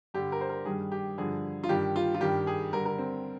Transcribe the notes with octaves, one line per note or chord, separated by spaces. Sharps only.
G2 D3 G3 G4
A#4
C5
A#4
G2 D#3 G3 G#4
G4
G2 D3 F3 G#4
F4
G2 D#3 G3 G4
F4
F4
G2 D#3 G3 G4
G#4
G2 D3 G3 A#4
A#4
C4